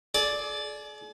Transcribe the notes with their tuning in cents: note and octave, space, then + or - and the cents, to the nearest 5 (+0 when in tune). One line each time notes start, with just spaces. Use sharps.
G#4 +40 D5 +0